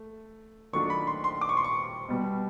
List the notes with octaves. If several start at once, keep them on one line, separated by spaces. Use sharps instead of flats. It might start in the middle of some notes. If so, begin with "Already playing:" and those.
Already playing: A3
D#3 F#3 A3 D4 F4 C#6
B5
C6
C6
D6
C#6
C6
C#6
B2 G3 B3